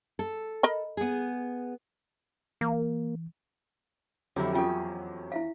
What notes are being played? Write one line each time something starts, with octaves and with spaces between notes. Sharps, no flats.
A4
A#4 D#5 B5
B3 G#4
E3 A#3
F2 D3 D#3 F#3 E4 G4
E2 C#4 F4 A4 G5
E4 E5 F5